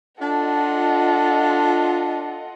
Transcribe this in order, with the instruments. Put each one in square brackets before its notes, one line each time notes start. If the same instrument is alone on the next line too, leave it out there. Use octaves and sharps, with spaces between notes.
[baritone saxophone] D4 [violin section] F4 D#5 F#5 [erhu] A4